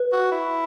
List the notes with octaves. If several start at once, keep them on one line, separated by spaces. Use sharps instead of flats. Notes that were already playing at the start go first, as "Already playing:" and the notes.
Already playing: B4
F#4
E4